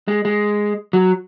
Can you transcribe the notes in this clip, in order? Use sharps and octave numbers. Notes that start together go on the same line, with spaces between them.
G#3
G#3
F#3